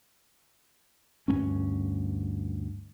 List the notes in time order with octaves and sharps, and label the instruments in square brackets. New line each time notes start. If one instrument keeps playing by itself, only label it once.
[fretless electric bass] D2 G2 A3 C#4